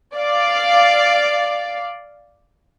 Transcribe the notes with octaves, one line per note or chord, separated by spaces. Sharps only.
D5 F5